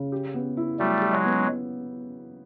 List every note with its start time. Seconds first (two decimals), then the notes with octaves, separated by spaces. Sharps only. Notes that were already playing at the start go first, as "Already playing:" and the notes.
Already playing: C#3
0.12 G4
0.34 B3
0.57 E4
0.79 F#3 G3 A3
1.01 G4
1.12 F#3 G#3
1.24 B3